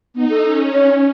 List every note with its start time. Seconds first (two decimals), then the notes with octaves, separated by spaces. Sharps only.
0.15 B3 D#4
0.30 A4
0.43 C#4
0.73 C#5